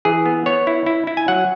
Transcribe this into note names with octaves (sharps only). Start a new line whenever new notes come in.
E3 G#4
B3
B3 C#5
E4
E4
E4
G#5
F#3 F#5